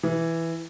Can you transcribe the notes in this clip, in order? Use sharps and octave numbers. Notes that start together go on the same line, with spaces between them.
E3